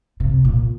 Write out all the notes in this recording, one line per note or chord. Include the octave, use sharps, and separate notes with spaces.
C3
A#2